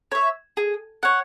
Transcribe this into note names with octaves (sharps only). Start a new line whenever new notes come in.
C#5 E5
G#4
C#5 F#5